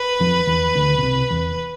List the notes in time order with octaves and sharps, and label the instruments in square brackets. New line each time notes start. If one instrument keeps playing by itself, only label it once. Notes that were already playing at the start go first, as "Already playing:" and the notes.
Already playing: [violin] B4
[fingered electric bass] F2 F3
E2 E3
D2 D3
B2
C2 C3
E2